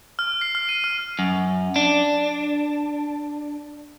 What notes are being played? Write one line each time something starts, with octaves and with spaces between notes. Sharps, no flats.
F6
C7
F6
D#7
F6
F#2
D4